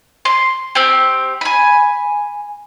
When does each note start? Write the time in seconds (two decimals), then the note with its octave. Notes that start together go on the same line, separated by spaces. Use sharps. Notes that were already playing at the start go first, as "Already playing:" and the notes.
0.25 C6
0.75 C4 G4
1.41 G#5 B5